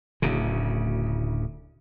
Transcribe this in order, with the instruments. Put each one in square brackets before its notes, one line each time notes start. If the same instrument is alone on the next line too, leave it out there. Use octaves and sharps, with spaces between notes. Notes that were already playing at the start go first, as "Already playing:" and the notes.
[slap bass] D1 D2 C#3